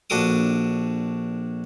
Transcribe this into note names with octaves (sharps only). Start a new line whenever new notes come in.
A#1 D4 F#4 A4 D6 D#6